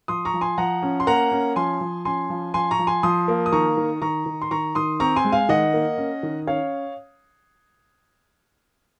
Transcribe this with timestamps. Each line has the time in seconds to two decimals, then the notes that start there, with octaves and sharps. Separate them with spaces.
0.08 F3 C6 D#6
0.25 A#5 C#6
0.34 F3
0.41 G#5 C6
0.58 F3 F#5 A#5
0.83 C#4
1.00 C6
1.07 A#3 F#5 A#5
1.32 C#4
1.56 F3 G#5 C6
1.81 F3
2.05 C#4 G#5 C6
2.30 F3
2.54 F3 G#5 C6
2.71 A#5 C#6
2.79 F3
2.87 G#5 C6
3.03 F3 C6 D#6
3.28 A#3
3.46 D#6
3.52 D#3 A#5 C#6
3.77 D#3
4.02 D#3 A#5 C#6
4.26 D#3
4.42 C6
4.51 D#3 A#5 C#6
4.75 D#3 C6 D#6
5.00 C4 A#5 C#6
5.16 G#5 C6
5.25 G#3
5.32 F5 G#5
5.49 D#3 D#5 F#5
5.74 A#3
5.98 C#4
6.23 D#3
6.47 C#4 C#5 F5